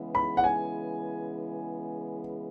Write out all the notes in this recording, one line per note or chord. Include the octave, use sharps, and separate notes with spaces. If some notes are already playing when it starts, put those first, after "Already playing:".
Already playing: C#3 E3 G#3 B3 E4
B5
F#5
G#5